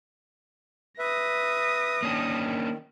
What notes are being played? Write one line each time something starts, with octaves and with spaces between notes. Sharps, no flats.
B4 E5 D#6 A#6
D#3 A#3 C#4 D4